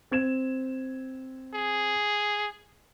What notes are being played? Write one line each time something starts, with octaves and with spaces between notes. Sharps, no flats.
C4 G#6 E7
G#4